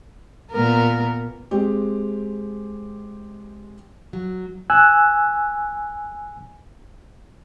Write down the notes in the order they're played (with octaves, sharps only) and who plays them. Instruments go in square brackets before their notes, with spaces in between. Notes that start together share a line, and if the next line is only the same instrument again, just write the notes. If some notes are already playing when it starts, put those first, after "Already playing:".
[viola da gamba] A#2 B3 A#4
[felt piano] G#3 C4 G4
[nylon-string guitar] F#3
[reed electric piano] G#5 E6 F#6